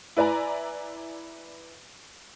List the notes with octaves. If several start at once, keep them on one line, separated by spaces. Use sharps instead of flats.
E4 B4 D5 G#5 A#5